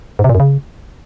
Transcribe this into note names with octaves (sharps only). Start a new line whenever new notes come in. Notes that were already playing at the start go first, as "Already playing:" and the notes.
G#2
C3
A#2
F#2
C#3